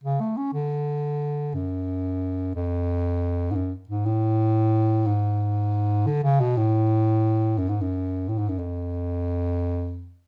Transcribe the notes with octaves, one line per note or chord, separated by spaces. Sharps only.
C#3
A3
C#4
D3
F#2
F2
G#2
F#2
G#2
A2
G#2
D3
C#3
B2
A2
F#2
G#2
F#2
A2
G#2
F#2
F2